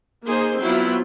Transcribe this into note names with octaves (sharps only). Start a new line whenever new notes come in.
A#3 D#4 G#4 C5
F#3 B3 C4 E4 F4